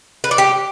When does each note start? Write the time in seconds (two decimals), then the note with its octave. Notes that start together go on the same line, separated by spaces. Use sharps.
0.24 B4
0.31 D5
0.38 G4